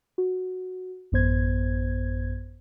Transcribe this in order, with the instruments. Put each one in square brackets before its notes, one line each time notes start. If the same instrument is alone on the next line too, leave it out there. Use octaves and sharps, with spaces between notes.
[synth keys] F#4
A1 F#2 B3 C5 G#6